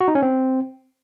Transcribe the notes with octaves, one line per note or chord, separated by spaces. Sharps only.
F#4
D#4
C#4
C4